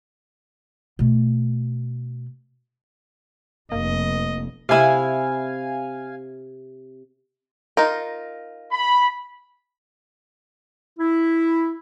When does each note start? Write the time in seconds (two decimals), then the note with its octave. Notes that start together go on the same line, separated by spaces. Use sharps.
0.99 B2 A3
3.72 F1 A#3 D#5
4.69 C3 E4 F5 G#5
7.77 D#4 F4 A#4
8.71 B5
10.98 E4